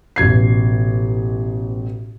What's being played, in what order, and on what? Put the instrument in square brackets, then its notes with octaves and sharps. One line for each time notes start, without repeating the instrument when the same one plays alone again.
[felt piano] A1 B2 G#6 C7